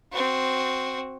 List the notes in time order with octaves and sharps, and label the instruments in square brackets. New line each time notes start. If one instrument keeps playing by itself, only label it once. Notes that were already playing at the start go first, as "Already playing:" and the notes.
[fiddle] C4 F#4